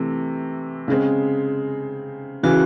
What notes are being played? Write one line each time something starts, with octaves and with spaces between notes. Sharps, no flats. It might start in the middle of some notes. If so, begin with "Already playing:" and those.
Already playing: C3 E3 A3
C#3 G#3 C4
C#3 E3 F#4